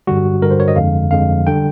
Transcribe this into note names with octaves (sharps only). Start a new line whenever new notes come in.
G2 D3 G3 F#4
G2 D3 G3 A#4
C5
C#5
D#5
F2 D3 F3 G#3 F5
F2 D3 F3 G#3 F5
D3 G3 G5